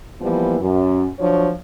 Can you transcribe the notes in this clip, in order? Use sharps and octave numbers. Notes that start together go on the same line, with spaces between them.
E3 F3 G3 A#3 B3
F#2
F3 F#3 D4 C#5